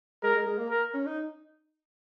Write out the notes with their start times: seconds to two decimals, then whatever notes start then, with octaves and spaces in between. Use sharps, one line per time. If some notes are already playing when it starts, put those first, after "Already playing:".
0.23 G#3 A#4
0.34 G#3
0.46 G#3
0.58 A#3
0.70 A#4
0.93 C#4
1.06 D#4